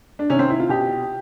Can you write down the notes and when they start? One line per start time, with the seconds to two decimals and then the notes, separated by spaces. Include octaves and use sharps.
0.19 D4
0.30 C3 D#3 C#4
0.39 C4
0.50 E4
0.60 F4
0.69 B2 G4